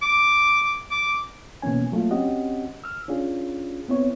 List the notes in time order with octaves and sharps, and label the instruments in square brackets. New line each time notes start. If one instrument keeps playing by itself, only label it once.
[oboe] D6
D6
[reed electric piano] B2 E3 A#3 C#4 G#5
F#3 A3 A#3 F4
C4 C#4 F#4 G4 D#5 F#5
E6 F6
C#4 D4 F4 G#4
B3 C4 E4 C#5